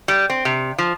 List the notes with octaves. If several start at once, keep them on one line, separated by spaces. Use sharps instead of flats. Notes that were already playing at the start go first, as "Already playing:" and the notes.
G3
C4
C3
F3